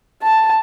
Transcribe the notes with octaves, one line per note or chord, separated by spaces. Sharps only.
A5